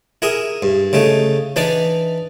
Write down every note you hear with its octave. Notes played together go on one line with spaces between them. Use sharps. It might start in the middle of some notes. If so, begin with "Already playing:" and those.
E4 G#4 A#4 D#6
G2
C#3 A3 D#4
E3 D4 D#4 B4 D5